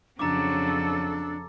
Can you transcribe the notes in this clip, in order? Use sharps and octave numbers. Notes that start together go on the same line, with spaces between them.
F2 C#3 F#3 D4 A4 A#5 D6